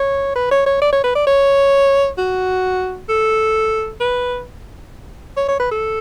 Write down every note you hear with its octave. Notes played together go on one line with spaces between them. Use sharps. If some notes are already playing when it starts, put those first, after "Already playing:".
Already playing: C#5
B4
C#5
C#5
D5
C#5
B4
D5
C#5
F#4
A4
B4
C#5
C#5
B4
A4